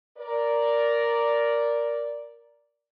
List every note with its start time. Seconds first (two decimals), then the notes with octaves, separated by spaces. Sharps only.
0.18 A#4 D5